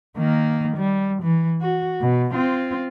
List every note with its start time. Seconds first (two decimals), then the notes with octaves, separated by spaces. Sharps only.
0.18 D#3 A#3
0.76 G3
1.23 E3
1.61 F#4
2.01 B2
2.32 C4 F4